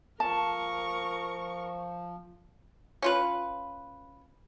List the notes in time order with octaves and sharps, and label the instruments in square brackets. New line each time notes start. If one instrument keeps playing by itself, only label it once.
[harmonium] F3 [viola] A#4 C#6 [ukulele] A5
[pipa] C#4 F4 B4